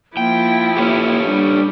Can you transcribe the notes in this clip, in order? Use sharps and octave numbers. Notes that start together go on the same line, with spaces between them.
F3 A#3 E4 G5
A#3 G4 A4 C#5
G3 D4